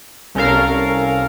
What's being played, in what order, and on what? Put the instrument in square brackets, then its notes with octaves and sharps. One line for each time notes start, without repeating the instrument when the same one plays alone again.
[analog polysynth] C2 C#4 A4 A#4 F5